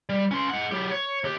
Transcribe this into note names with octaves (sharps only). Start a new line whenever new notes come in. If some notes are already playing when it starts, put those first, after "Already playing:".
G3
C#4 C6
G#3 F#5
F#3 G4
C#5
D#2 G4